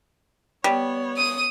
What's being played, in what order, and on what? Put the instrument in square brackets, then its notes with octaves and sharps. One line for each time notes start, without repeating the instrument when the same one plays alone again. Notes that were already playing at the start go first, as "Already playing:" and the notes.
[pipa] G3 [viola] B3 C#5
[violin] D#6 D#7